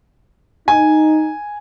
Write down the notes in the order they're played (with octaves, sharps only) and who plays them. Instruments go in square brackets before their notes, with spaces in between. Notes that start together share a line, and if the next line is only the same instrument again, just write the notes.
[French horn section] D#4 [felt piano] G#5